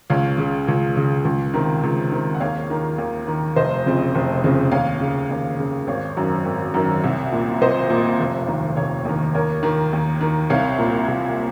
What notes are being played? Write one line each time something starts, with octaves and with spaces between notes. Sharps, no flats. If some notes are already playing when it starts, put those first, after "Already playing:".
C#2 C#5 F5
C#3
C#2
C#3
C#2
C3 D#3
C#2
C3 D#3
F#5
D#2 C#5 F5
D#3
D#2
D#3
F1 C5 D#5
F2 C#3
F1
F2 C#3
D#2 C#5 F5
C#3
D#2
C#3
G#1 C#5 F5
F#2 D#3
G#1
F#2 D#3
C2
A#2
C2 C5 D#5
A#2
F1
D#2 D#3
F1 C#5 F5
D#2 D#3
D#2 A#4 C#5
D#3
D#2
D#3
C2 C#5 F5
A#2
C2